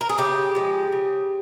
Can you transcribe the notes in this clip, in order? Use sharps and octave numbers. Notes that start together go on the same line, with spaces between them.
A#4
G#4
C#3 G4
F3 G#3
C#3